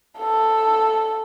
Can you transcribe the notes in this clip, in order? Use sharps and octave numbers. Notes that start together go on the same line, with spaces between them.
A4